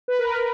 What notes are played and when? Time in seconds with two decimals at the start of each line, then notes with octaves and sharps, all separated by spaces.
0.08 B4
0.19 A#4
0.26 B4